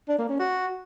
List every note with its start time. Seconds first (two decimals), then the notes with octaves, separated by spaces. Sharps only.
0.08 D4
0.19 A#3
0.29 C#4
0.40 F#4